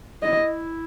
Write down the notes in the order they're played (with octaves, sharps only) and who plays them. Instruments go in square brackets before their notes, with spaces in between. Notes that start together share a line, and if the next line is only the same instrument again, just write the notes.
[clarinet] E4 [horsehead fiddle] D#5